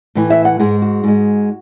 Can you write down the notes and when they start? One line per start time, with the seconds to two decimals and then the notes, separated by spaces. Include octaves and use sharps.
0.15 A2 E3 A3
0.30 E5
0.45 F#5
0.59 G#2 G#3 G#4
0.82 F#4
1.04 G#2 G#3